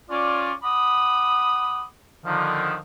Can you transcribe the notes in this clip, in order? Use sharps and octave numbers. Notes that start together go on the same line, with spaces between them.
C#4 F4 D5
F#5 B5 D6 D#6
D3 D#3 F3